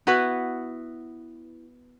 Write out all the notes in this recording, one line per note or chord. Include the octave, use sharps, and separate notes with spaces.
B3 E4 F#4 B4